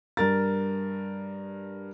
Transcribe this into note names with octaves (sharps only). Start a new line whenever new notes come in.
G2 A#4 A6